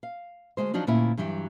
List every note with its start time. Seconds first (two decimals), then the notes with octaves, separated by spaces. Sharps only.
0.03 F5
0.57 D2 G#2 G#3 C5
0.74 F3 F#3 D4 D#4 F#4
0.87 D2 A#2 C#4 E4
1.17 G2 E3 F#3 G4